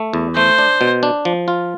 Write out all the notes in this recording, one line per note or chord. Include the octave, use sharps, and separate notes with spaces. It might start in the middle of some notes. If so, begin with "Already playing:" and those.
Already playing: A3
E2
A3 C5
D4
B2
D4
F3
F4